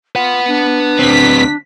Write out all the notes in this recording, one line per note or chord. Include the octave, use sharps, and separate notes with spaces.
F4 B4 F#5
D4
D2 C4 B6